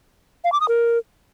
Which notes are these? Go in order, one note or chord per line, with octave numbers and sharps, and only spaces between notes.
F5
D6
D#6
A#4